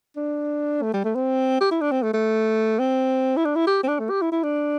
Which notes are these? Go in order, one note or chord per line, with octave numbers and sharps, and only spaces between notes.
D4
A3
G3
A3
C4
G4
E4
D4
C4
A3
A3
C4
E4
D4
E4
G4
C4
D4
A3
G4
E4
E4
D4